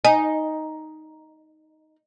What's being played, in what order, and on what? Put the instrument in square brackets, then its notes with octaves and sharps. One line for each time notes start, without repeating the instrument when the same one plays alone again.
[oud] D#4 [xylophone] G#5